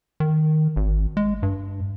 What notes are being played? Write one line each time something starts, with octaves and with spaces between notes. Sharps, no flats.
D#3
G#1
G#3
G2